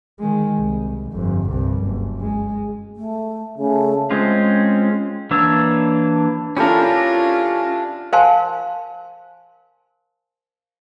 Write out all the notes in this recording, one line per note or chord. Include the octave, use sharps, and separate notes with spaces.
D#3 G#3
C2
G1 F2
C2 G2
F#1
G#3
A3
C#3 A3
G#3 C4 C#4 F4
E3 A#3 D4 C#5 E6
C#4 D4 E4 F4 G4 A4 A#4
A#4 C5 F5 G#5 A5 C6